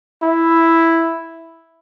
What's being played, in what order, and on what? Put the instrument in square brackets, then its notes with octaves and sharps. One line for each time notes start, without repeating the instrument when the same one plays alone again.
[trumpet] E4